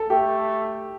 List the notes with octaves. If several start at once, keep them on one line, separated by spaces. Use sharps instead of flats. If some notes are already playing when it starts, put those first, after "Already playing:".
Already playing: A4
A3 G4